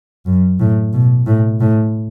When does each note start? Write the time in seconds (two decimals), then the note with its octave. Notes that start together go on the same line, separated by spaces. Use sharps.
0.26 F#2
0.60 A2
0.93 B2
1.27 A2
1.61 A2